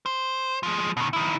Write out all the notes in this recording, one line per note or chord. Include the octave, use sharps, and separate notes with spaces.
C5
F3 G#3
B2 D#3
D#3 E4